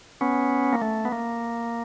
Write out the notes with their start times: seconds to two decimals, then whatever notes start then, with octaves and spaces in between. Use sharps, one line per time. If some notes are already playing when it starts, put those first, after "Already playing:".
0.21 B3 C#4
0.73 A#3
0.82 A3
1.05 B3
1.12 A#3